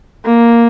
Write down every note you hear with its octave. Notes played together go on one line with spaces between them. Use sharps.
A#3